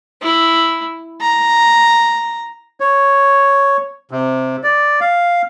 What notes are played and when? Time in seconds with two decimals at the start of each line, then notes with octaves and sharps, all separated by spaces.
0.22 E4
1.21 A#5
2.80 C#5
4.11 C3
4.64 D5
5.01 F5